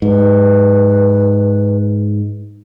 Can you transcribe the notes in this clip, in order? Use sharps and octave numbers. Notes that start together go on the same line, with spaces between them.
G#2 B4